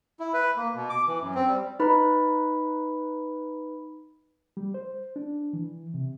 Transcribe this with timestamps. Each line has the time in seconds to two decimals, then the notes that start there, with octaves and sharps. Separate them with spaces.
0.20 E4
0.34 B4
0.56 A#3
0.75 B2
0.89 D6
1.07 E3
1.21 F#2
1.34 C4
1.47 G3
1.80 D#4 B4 B5
4.57 G3
4.74 C5
5.16 D4
5.53 E3
5.94 C3